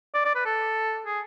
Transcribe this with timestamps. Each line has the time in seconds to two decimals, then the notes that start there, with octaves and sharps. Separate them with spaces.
0.14 D5
0.25 D5
0.35 B4
0.45 A4
1.06 G#4